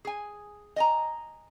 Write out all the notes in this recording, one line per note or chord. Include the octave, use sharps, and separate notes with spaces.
G#4 G#5
D#5 G#5 A#5